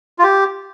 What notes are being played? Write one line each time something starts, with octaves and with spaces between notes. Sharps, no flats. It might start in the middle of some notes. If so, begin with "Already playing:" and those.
F4
G4